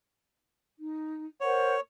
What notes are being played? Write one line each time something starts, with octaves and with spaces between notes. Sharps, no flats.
D#4
A#4 C5 C#5 F#5